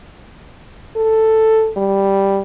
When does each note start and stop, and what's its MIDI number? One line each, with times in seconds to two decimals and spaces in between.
0.96 1.71 69
1.77 2.41 55